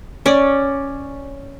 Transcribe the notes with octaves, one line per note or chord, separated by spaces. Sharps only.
C#4 D5